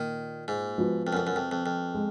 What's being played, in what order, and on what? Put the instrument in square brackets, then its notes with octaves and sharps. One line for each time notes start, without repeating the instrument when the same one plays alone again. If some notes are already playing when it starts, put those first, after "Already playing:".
Already playing: [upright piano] A#2 [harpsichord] D#3
[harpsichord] G#2
[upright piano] F3 G#3 B3 F#4
[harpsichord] F2
F#2
F2
F#2
F2
F2
F2
[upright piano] G#3